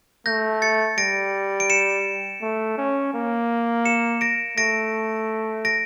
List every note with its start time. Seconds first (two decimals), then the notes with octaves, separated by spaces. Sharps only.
0.26 A3 G6 A#6
0.62 A6 C#7
0.98 G3 A#6 D7
1.60 D7
1.70 C#7 E7
2.42 A3
2.78 C#4
3.14 A#3
3.85 C#7 E7
4.21 A#6 D7
4.57 A3 A#6 D7
5.65 A#6 D7